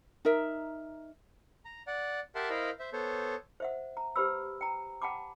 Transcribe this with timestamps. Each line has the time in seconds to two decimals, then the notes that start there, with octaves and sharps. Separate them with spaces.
0.25 D#4 A#4 E5
1.65 A#5
1.87 D5 F#5
2.35 G4 A#4 E5 F#5 A5 C6
2.50 E4 A#4 C5 D#5 F5 B5
2.79 C5 E5
2.93 B3 A4 C5 C#5
3.60 C5 E5 F#5
3.97 A#5
4.16 G4 B4 C5 B5 E6
4.61 G5 A#5
5.02 F#5 G5 A5 B5 D6